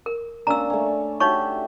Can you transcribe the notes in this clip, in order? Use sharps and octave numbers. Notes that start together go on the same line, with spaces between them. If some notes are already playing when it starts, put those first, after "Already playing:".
A#4
A#3 C#4 D4 A#5 E6
A3 C#4
D#4 F#4 G4 C#5 E5 C#6